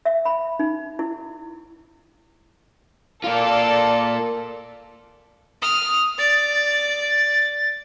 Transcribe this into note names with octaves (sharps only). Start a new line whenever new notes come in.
E5
B5
D#4
E4
A#3 F4 A4 D5
D#6 F6
D5 A6